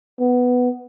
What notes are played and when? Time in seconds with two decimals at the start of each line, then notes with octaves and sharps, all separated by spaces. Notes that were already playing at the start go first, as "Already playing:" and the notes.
0.20 B3